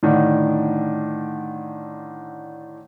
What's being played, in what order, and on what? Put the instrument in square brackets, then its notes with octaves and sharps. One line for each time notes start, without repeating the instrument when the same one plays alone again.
[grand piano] A2 D3 D#3 D4